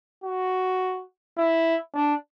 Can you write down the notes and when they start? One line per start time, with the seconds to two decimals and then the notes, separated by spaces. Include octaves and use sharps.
0.24 F#4
1.37 E4
1.94 D4